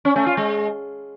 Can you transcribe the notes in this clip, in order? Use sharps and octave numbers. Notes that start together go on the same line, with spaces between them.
C#4
A3
F4
G#3